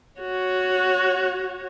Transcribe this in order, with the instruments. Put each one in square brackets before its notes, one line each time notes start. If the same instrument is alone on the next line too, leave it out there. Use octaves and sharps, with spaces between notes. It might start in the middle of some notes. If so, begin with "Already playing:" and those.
[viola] F#4 C#5